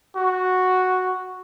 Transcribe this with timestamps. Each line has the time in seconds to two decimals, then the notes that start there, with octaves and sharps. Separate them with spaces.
0.16 F#4